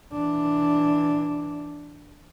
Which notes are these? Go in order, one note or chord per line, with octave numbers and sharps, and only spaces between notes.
E3 D4